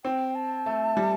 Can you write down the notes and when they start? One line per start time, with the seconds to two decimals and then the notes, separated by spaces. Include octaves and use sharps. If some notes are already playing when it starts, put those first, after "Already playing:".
0.04 C4 G5
0.35 A5
0.66 A3
0.97 G3